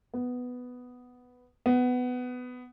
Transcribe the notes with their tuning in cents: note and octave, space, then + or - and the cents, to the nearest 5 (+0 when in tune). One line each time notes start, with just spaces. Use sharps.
B3 +5
B3 +15